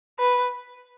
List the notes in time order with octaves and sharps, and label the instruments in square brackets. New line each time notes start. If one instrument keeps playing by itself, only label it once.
[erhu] B4